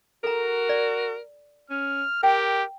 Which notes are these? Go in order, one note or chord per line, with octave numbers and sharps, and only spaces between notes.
F#4 A4 A#4 A#5
D5
C#4 F6
G4 A#4 G5